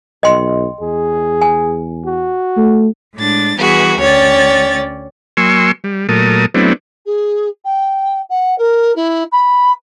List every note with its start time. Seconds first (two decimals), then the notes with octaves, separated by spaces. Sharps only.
0.23 B1 D#5 G5 C6
0.81 E2 G#4
1.41 G#5
2.05 F#4
2.57 A3
3.15 A2 G#3 D4 A6
3.57 E3 G3 B3 F#4 G#4 B4
4.00 D2 C#4 C#5 D5 G5 A6
5.37 F#3 A#3 G#5 C6 C#6 E6
5.84 G3
6.09 A#2 F#3 A3 A#4 A5 D#6
6.54 F#3 A3 B3 C4 D4 E4
7.06 G#4
7.64 G5
8.29 F#5
8.58 A#4
8.95 E4
9.32 B5